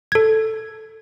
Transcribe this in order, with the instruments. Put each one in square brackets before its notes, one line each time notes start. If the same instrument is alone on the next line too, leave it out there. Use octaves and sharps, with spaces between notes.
[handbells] A4 G#6